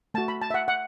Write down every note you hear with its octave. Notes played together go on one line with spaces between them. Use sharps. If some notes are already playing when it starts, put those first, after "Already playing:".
A3 F#4 A5
B5
A5
E5
F#5
F#5